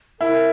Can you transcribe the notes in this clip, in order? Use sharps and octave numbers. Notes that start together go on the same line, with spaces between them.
E4 A#4